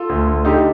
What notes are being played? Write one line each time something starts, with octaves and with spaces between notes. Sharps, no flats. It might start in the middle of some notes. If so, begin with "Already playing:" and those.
Already playing: F4 A4
D2
D2
D3 D#4 G4